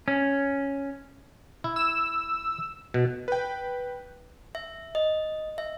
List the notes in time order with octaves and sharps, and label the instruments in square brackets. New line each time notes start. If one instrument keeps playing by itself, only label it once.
[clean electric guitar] C#4
[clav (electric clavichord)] E4
[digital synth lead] E6
[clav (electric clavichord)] B2
[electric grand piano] B4 G5
[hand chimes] E5
D#5
E5